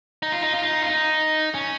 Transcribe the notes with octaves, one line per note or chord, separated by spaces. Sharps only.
D#4
F4
D#4
F4
D#4
F4
D#4
C#4